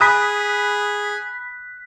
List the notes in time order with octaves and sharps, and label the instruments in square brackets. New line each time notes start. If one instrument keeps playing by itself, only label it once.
[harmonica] G#4 [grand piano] B5 D#6 [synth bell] F#6 B6